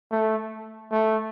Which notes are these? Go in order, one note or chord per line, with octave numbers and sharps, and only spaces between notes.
A3
A3